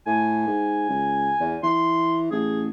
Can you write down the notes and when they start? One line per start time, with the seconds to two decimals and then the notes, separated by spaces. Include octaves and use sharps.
0.07 A2 G#5
0.47 G#2
0.89 C#2
1.40 E2
1.63 E3 C6
2.31 A1 G#4